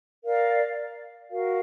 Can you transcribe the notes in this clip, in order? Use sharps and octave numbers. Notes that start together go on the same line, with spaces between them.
A#4 D5 F5
F#4 A#4 F5